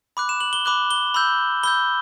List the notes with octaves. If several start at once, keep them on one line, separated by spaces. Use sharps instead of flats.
B5 D6 F#6
E7
F#7
G7
B5 D6 F#6 G7
G7
B5 E6 G6
B5 E6 G6 G7